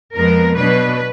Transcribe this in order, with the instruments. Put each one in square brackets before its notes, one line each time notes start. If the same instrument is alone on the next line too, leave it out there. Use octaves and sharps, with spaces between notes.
[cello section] F2 F3 G#3 B3 A#4
B2 F#3 B3 D4 B4